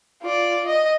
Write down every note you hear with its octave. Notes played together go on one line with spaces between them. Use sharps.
F4 D5
D#5